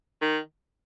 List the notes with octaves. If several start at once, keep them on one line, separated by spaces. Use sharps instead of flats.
D#3